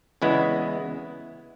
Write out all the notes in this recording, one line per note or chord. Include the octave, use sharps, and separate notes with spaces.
E2 C#3 G#3 B3 E4